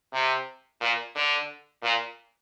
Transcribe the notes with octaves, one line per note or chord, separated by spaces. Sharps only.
C3
A#2
D3
A#2